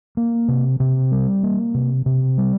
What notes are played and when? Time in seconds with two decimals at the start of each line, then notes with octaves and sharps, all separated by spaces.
0.17 A#3
0.48 C3
0.80 C3
1.12 G3
1.43 A#3
1.74 C3
2.06 C3
2.38 G3